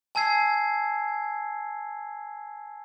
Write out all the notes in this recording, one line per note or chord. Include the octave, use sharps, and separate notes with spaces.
G#5 A5 E6 G#6 C7